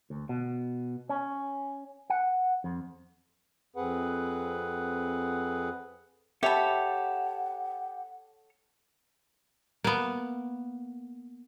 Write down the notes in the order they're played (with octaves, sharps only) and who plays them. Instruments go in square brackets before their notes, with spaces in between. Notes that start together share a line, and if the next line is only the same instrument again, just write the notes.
[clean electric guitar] D2
B2
C#4
F#5
F2
[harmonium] F2 C4 G#4 B4 F#5
[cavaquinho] G4 B5 [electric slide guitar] A4 C#5 A5 [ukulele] E5 [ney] F#5
[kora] A#3 B3